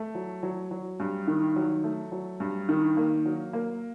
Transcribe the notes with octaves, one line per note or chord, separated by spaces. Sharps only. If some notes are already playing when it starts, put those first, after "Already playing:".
Already playing: A3
F#3
F#3
F#3
G2
D#3
F#3
A3
F#3
G2
D#3
A#3
F#3
A#3